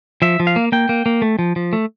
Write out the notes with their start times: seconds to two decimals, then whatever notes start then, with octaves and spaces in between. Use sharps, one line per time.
0.22 F3 E5
0.40 F3
0.47 F5
0.56 A#3
0.72 A#3 G5
0.89 A#3
1.06 A#3
1.22 A3
1.39 F3
1.56 F3
1.73 A3